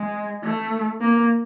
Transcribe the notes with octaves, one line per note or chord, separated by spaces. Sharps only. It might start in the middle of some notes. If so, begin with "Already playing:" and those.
Already playing: G#3
A3
A#3